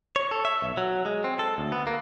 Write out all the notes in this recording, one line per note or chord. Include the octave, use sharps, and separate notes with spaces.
C#5
A4
E5
B1
F#3
G#3
C4
A4
D2
B3
A#3